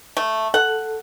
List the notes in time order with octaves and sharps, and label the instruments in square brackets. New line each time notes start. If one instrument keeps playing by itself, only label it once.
[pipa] A3
[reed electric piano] A4 [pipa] F#5